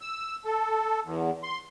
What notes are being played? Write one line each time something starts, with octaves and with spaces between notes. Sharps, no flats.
E6
A4
E2
C6